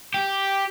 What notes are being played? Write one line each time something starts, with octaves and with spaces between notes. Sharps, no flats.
G4